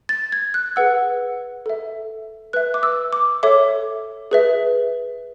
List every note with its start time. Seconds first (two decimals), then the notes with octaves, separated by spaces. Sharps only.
0.09 A6
0.32 G#6
0.54 F#6
0.76 G#4 B4 F#5 E6
1.66 A4 E5
2.53 B4 E5 F#6
2.74 D6
2.83 E6
3.13 D6
3.43 A4 C#5 E5 D6
4.31 G#4 B4 E5